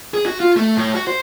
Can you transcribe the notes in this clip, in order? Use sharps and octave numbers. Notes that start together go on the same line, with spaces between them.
G#4
F#4
F4
A3
A2
F#4
C5